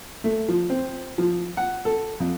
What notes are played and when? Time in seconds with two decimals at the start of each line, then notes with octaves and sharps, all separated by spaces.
0.24 A3
0.48 F3
0.70 C4
1.18 F3
1.57 F#5
1.85 A4
2.20 F2